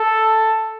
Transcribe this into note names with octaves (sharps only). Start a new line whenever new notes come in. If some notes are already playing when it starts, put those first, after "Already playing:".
Already playing: A4